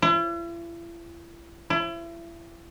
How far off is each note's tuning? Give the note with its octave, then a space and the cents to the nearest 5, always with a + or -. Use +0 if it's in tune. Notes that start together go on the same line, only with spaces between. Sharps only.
E4 +45
E4 +35